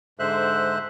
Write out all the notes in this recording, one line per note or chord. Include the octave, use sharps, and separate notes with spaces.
G#2 D3 G#3 C5 E5 F#6